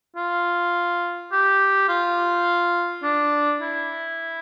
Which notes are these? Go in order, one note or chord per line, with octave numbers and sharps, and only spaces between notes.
F4
G4
F4
D4
E4